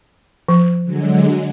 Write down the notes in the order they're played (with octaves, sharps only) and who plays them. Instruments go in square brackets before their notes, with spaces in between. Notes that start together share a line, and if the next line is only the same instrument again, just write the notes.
[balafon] F3
[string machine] D3 F#3 G#3